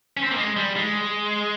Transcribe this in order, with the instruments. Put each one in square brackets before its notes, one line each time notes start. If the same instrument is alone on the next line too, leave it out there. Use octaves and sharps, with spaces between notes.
[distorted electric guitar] C#4
C4
A#3
G#3
G3
G#3